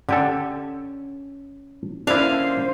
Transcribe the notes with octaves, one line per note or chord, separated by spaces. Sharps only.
D3 C#4 G4 A4
D3 A#3 C#4 D4 E4 C5 F5